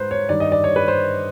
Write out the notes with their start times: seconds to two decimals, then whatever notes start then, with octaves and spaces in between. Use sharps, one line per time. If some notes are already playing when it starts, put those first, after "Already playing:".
Already playing: G#2 B4 C5
0.11 C#5
0.29 G2 D#3 D5
0.40 D#5
0.52 D5
0.64 C#5
0.76 B4
0.88 C5